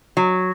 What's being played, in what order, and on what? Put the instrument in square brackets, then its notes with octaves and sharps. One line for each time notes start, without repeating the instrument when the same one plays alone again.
[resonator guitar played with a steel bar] F#3